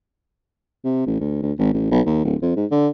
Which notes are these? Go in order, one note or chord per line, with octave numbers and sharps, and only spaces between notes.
C3
A1
D2
D2
G#1
A1
B1
D#2
D1
F2
G#2
D3